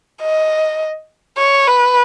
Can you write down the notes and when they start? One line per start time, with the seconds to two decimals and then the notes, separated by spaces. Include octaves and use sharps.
0.22 D#5
1.38 C#5
1.67 B4